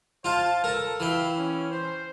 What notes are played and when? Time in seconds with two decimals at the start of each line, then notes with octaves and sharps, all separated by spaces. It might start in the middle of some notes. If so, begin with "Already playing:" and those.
0.24 F4 C5 F5 A5
0.64 A4 A#4 A5
1.00 E3 E4 E5 F5 G5
1.38 C#4
1.72 C5